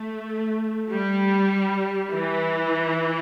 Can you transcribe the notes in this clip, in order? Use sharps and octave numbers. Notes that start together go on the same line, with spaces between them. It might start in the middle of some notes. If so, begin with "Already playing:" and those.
Already playing: A3
G3
E3